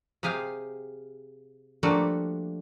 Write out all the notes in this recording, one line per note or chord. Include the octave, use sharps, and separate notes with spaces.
C3 G4 G#4 F5 G#5
F3 G3 A3 A#3 D4 F#4